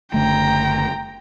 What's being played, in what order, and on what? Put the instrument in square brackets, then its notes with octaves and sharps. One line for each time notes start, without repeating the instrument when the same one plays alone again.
[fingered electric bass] F#1 D3 A3 [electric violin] G5 A#5